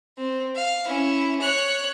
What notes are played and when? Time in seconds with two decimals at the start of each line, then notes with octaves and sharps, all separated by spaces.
0.18 C4
0.55 F5
0.86 C#4 E4
1.41 C#5 F#6